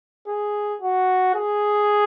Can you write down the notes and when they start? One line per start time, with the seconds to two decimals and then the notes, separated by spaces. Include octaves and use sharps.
0.28 G#4
0.82 F#4
1.35 G#4